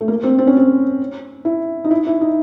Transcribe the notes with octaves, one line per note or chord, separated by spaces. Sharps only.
A3
A#3
C4
C4
C#4
C4
E4
D#4
E4
E4
D#4